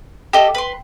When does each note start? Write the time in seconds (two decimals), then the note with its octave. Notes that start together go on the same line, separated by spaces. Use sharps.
0.33 G4 A4 D#5 G5
0.55 B4 C6